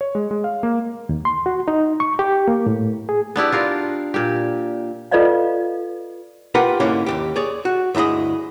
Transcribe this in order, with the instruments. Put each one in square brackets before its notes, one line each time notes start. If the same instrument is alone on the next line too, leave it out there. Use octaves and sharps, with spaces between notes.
[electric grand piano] C#5
G#3
G#3
F5
A#3
[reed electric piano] D#2
C6
F#4
D#4
C#6
G4
A#3
A2
G#4
[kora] B3 D4 E4 G4
D4 F4 A#4
A#2 G4
[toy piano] F4 A4 B4 D5 D#5 F5
[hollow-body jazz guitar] F4 G4 A#4 B4 F#5 G5
G#2 D3 A#3 C#4 E4
D#2 G#2 G4
G#4 C#5 D5
F#4
D2 G2 E4 G#4 D#5